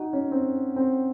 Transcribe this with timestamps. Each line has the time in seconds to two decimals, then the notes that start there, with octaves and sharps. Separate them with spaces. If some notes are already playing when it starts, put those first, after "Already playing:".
Already playing: D#4 F#4
0.13 C#4
0.32 C4
0.76 C4